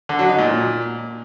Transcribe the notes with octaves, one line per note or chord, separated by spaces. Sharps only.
D3
F#3
D#4
A#2